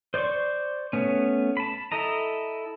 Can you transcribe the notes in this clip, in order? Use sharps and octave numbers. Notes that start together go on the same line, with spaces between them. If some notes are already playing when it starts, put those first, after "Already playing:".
C5 D5 C6 C#6
A3 B3 C#4
A5 B5
E4 A4 D#5 A#5